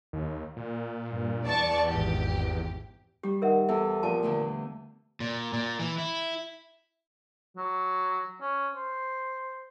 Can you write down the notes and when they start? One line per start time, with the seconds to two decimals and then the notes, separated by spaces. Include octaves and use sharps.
0.13 D#2
0.57 A#2
1.10 G2
1.45 E2 D5 A5 C#6
1.86 G#1 G4
3.23 G3 G4
3.42 D#3 A#4 E5 F#5
3.69 E2 A4 E5
4.03 A#2 F3 A5 D6
4.23 E2 D3 A3
5.20 A#2
5.53 A#2
5.79 E3
5.98 E4
7.57 F#3
8.41 C#4
8.75 C5